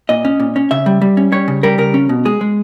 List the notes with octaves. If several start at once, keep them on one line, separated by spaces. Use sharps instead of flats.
A#2 D#5
C#4
A#2
C#4
C#3 E5
G3
G3
C#4
G3 C#5
C#3
G3 A#4
C#3 A#4
C#4
B2
G#3 G#4
G#3